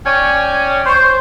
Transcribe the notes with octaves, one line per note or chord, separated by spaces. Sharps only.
C#4 C#5 D5 G5 G#5
C5 C#6 G6